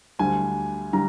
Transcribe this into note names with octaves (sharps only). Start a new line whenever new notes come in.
D2 D3 G3 G#5
D3 G3 A#5